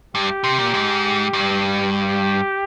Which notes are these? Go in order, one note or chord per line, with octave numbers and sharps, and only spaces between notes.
G2 G4
C3
A#2
G#2
G2
G4